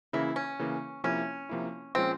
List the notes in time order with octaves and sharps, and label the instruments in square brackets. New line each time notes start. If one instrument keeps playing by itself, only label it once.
[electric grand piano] C#3 E3 A#3 [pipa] E4
[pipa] C#4
[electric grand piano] C#3 E3 A#3
[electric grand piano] C3 F3 A#3 E4 [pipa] C#4
[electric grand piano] C3 F3 A#3 E4
[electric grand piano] A#2 F3 G#3 C#4 F4 [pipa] C4